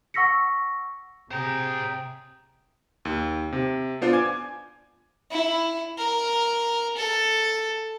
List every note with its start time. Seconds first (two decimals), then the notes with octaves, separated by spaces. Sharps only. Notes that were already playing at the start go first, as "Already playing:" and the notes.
0.14 F#5 C#6 E6 A#6 B6 C#7
1.31 C3 G#4 C5 G5 A#5
3.05 D#2
3.52 C3
4.01 B3 D4 F4 C5 D5
4.13 G#5 D6 G#6
5.31 E4
5.98 A#4
6.97 A4